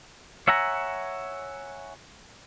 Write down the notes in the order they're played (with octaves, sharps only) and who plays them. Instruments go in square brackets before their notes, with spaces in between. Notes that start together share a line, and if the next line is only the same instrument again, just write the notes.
[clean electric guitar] C#5 E5 F#5 G#5 A#5